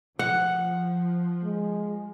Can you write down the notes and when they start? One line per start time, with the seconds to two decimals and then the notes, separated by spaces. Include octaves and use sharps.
0.19 F3 F#5
1.44 G#3